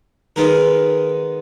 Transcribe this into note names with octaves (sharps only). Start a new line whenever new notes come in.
D#3 G#3 B3 D#4 A#4